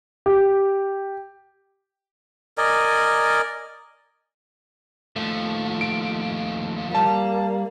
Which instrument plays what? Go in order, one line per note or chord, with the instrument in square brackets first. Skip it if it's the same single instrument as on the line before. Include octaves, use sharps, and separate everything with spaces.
[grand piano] G4
[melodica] A#4 D5 D#5 G#5
[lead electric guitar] D#2 F3 [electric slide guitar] A3
[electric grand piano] D7
[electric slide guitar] G3 [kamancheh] A#3 [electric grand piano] A5